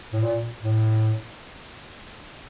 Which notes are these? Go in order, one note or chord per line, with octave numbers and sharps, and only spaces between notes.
A2
A#2
A2